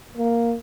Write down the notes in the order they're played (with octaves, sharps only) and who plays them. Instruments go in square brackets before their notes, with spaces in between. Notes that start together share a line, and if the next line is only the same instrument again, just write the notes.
[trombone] A#3